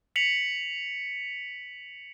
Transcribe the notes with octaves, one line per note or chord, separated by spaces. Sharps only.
B6 C#7 F7 F#7